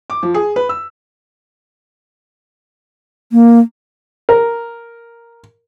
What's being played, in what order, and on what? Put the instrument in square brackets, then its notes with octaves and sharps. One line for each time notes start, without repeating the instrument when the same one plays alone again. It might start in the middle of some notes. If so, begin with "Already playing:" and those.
[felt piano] D6
F3
G#4
B4
E6
[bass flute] A#3
[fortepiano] A#4